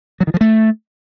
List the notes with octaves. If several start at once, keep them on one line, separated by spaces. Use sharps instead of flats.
F#3
D#3
F3
A3